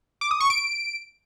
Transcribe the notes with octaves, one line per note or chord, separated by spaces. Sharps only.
D6
D#6
C#6
D7